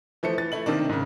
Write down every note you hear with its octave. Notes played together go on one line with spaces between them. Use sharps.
E3 F3 A3 C#7
E3 A6
A3 E4 F#7
C3 D#3 A#3 D4
G#2 C#3